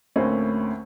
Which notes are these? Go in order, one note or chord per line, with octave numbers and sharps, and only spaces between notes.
D2 A2 A#3 C4 C#4